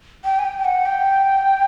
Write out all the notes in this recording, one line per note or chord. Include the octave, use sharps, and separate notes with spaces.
G5
G#5
G5
G5
F#5
G5